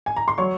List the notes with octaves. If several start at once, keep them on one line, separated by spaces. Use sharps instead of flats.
G#5
A#5
C6
F#3 C#5 C#6